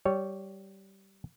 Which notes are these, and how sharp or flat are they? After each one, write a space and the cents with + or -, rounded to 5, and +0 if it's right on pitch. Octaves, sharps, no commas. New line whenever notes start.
G3 -15 C#5 +0